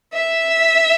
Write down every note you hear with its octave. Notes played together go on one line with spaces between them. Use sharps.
E5